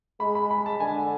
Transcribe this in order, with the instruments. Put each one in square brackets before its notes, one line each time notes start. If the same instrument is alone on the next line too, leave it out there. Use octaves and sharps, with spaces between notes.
[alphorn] G#3 [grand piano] B5
[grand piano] B5
B5
A5
[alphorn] D3 [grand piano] G#5